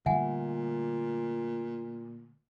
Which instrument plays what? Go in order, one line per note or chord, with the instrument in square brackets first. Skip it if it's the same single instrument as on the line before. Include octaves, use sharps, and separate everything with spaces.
[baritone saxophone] A#2 [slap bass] D3 G3 A3 [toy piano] E5 F#5 G#5